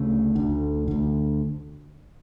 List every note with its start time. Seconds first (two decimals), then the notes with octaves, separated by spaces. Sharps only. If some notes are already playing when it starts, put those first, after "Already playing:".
Already playing: D2 C#3 A3
0.36 D2 D3
0.88 D2 D3